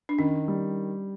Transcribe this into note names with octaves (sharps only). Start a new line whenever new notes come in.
D4
D#3 C#4
G3